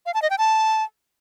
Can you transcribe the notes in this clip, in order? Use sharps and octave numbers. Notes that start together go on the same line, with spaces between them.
F5
A5
D#5
G5
A5